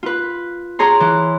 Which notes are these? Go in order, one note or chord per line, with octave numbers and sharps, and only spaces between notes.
F4 B4
G#4 C#5 A#5 C6
E3